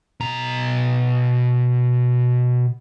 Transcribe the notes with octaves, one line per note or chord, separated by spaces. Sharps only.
B2 A#5